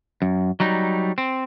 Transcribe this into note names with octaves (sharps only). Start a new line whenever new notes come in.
F#2
F#3 G3 D#4
C4